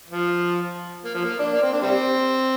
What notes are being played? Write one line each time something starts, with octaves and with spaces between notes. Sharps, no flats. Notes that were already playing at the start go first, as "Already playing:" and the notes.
F3
A#3
F3
A#3
D4
A#3
C4
D4
G3 C4